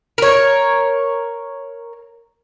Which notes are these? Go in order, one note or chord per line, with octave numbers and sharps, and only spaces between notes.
A#4 C#5